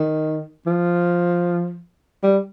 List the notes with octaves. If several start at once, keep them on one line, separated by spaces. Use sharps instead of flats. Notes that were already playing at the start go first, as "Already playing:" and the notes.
Already playing: D#3
F3
G3